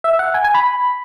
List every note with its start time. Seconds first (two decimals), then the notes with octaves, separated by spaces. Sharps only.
0.04 E5
0.19 F#5
0.34 G#5
0.44 G#5
0.54 B5